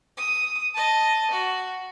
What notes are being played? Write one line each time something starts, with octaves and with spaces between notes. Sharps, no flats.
D#6
D#5 A5
F#4